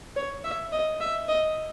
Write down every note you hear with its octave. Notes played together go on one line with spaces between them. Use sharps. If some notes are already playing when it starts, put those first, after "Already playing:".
C#5
E5
D#5
E5
D#5